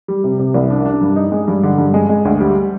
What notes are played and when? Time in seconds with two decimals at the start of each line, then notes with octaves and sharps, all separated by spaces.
0.08 G3
0.24 C3
0.39 C3
0.54 C2
0.70 D4
0.85 D4
1.01 G2
1.16 D#4
1.32 G#3
1.48 G2
1.63 D3
1.78 G2
1.94 G#3
2.09 G#3
2.25 D2
2.40 G3